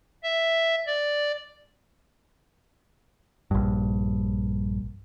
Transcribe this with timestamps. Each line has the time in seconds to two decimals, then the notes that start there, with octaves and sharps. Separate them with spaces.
0.23 E5
0.86 D5
3.51 A#1 G2